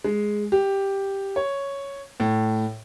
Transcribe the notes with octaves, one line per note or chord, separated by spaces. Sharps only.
G#3
G4
C#5
A2